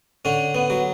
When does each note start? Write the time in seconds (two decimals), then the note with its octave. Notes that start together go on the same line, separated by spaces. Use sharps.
0.25 D3 C#4
0.55 B3
0.70 F#3